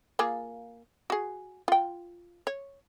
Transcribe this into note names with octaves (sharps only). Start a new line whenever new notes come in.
A#3 F4 G#4
F#4 G#4
F4 G5
C#5